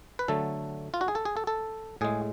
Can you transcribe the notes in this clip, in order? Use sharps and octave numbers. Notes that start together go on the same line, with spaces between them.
B4
D3 F#3 A3 A4
F4
F#4
G#4
A4
G#4
A4
A4
A2 G#3 G#4